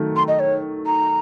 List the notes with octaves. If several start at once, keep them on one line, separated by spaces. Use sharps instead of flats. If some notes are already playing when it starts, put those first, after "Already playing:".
Already playing: D#3 F#3 A3
C6
D#5
C#5
A#5